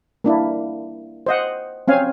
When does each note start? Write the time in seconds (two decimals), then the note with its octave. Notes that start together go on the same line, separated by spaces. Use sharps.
0.24 A#3 D4 E4
1.26 C5 D#5 F#5
1.88 C4 C#4 F5 G#5